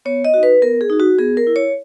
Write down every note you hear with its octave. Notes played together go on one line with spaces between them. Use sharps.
B3 C#5
D#5
D#4 F#4
B4
B3 A#4
G#4
D#4 F#4
F#4
B3 G#4
A#4
E4
C#5